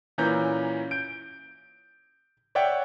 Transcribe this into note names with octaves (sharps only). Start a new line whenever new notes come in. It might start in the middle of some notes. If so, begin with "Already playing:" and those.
A#2 E3 C#4 A#5 G6
G6 D7
C#5 D5 E5 F#5 G5